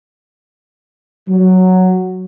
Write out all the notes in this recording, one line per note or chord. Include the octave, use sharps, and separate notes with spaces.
F#3